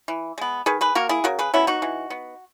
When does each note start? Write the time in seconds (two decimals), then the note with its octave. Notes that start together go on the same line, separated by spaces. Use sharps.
0.08 E3
0.38 G#3 B3
0.66 D#3 G#4 B4
0.81 G#4 B4
0.95 A#3 F#4 A#4
1.09 E4 G#4
1.24 C#3 F#4 A#4
1.39 G#4 B4
1.54 F#3 B3 C#4 E4
1.67 D#4 F#4
1.82 E3
2.10 B3